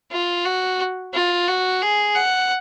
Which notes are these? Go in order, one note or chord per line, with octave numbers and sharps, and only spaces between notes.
F4
F#4
F4
F#4
G#4
F#5